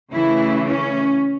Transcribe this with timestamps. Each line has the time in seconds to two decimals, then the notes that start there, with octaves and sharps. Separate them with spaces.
0.12 C#3 E3 A3 E4
0.67 C#4